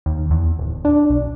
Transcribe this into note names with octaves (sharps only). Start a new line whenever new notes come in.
D#2
E2
D1
D4
B1